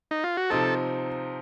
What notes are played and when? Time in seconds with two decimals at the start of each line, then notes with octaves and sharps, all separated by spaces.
0.11 D#4
0.24 F4
0.37 F#4
0.50 C3 F3 C4 D#4 A4